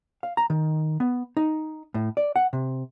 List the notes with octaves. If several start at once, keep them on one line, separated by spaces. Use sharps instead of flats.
F5
A#5
D#3
B3
D#4
A2
D5
F#5
C3